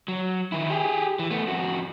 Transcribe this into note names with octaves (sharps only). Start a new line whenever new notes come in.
F#3
D#3 E4
G4 G#4
E3
A3 B3
F2 F#4